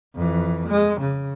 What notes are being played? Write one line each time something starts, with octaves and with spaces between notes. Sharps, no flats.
F2 E3
G#3
C#3